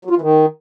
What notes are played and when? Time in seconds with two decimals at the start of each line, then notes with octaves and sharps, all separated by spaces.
0.05 F#3
0.10 F4
0.16 E3
0.21 D#3